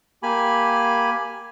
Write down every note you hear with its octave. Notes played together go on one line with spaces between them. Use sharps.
A#3 G4 G#5 B5